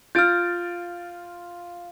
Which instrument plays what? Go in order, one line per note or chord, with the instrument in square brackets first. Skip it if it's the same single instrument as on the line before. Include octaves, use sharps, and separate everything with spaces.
[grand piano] F4 A6 D7 [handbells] F6 G6